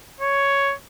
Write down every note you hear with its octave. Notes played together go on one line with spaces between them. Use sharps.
C#5